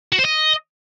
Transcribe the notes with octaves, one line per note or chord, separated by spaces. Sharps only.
F#4
C5
D#5